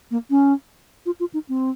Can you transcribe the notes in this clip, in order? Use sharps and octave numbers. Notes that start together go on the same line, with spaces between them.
A#3
C#4
F4
F4
D#4
C4